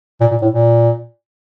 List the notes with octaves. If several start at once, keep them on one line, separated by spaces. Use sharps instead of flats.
A#2
A#2
A2
A#2